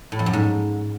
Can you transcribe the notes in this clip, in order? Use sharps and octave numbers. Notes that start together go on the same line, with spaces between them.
A2
F2
F#2
G#2